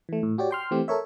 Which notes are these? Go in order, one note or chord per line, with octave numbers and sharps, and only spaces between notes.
E3 A3
A2
F#4 G4 C#5 D5
G5 C6 F6
E3 A3 C4 G4
A4 A#4 C#5 E5